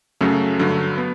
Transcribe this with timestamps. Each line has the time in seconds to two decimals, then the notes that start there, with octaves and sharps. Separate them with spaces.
0.21 F#2 C#3 F#3 A3
0.59 G2 D3 F#3
0.98 B3